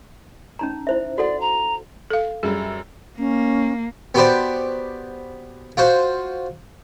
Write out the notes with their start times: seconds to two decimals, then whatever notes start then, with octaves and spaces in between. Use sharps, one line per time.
0.59 C#4 D#4 A#5
0.87 E4 C5 E5
1.18 F#4 A4 D5 F#5
1.41 A#5
2.10 A4 F5
2.43 F#2 G3 G#4
3.19 A#3 C#4
4.15 B3 F#4 G4 B4 C5 D5
5.77 F4 F#4 C5